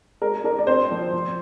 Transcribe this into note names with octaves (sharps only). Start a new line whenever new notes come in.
G#3 A#4
D4 A#4
D5
C4 C5
F3
F3